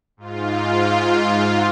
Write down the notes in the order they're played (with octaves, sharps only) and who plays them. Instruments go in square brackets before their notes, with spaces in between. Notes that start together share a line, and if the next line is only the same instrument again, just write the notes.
[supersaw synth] G#2 F4